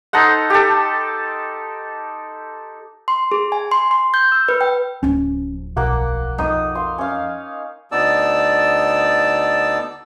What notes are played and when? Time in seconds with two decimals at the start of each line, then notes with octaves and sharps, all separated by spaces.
0.13 D#4 A4 C5 F#5
0.50 G4 A4
3.08 C6
3.32 G#4
3.52 G#5
3.71 C6
3.91 C6
4.14 G6
4.32 E6
4.49 B4
4.61 G5
5.03 D1 F3 C#4
5.76 B1 A#3 F#5 D6
6.38 F2 D#4 D#6
6.75 F5 C6
6.98 C#4 F5
7.92 D2 B3 D#4 D5 A5 E6